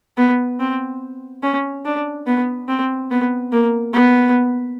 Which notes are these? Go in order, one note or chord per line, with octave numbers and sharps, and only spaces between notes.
B3
C4
C#4
D4
B3
C4
B3
A#3
B3